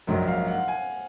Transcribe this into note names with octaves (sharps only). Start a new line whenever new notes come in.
A#1 G#2 F#3 A#3
F5
F#5
G#5